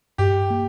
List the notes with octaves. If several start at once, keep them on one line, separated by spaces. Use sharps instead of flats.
G2 G4
A#3